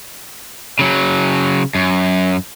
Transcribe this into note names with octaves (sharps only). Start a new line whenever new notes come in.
C#3 F#3
F#2